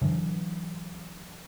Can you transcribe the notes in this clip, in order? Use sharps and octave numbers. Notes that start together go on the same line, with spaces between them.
D3 E3 F#3